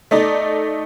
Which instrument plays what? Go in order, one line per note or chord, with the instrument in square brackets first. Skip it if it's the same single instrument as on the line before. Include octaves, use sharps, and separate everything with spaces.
[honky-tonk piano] A3 D#4 D5